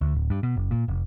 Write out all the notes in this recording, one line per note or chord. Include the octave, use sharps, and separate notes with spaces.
D2
D1
G2
B2
F#1
A#2
F1